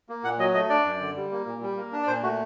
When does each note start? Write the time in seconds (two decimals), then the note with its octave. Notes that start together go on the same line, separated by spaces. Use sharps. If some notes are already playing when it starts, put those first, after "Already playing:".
0.09 A#3
0.24 A#2 F#5
0.39 F#3 D#5
0.54 A3 D#5
0.69 D4 D5
0.85 F#2
1.01 D3
1.16 G3
1.31 A#3
1.46 A#2
1.62 G3
1.77 A#3
1.92 D4
2.03 D5
2.07 A#2 C5
2.23 A3 F#4